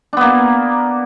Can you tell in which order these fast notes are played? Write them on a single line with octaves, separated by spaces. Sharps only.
D4 B3 A#3